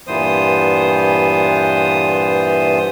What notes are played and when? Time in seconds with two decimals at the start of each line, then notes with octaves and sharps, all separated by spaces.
0.07 G2 A#2 E3 B3 C5 D#6